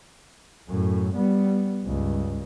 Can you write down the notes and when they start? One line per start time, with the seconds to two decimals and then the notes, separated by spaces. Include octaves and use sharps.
0.69 F#2 A2
1.14 G3 B3
1.85 C#2 G2